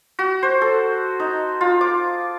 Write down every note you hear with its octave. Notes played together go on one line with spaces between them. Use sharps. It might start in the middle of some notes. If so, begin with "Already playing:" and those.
F#4
C5
A4
D#4
F4
D6